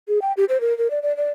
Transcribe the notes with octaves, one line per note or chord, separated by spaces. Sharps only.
G#4
G5
G4
C5
A#4
A#4
D5
D5
D5